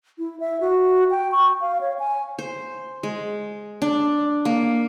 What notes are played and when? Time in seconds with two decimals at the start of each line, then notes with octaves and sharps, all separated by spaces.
0.19 E4
0.40 E5
0.61 F#4
1.11 G5
1.32 C#6
1.61 F5
1.81 C#5
1.99 G#5
2.39 C5
3.03 G#3
3.82 D4
4.45 A#3